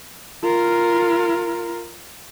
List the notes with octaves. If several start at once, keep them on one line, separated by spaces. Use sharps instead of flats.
F4 A#4